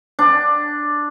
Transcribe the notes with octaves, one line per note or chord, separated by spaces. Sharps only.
D4